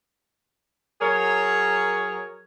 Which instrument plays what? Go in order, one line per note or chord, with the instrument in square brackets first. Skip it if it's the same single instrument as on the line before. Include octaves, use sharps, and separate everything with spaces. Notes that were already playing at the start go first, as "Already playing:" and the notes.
[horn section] F#3 G#4 A#4 C#5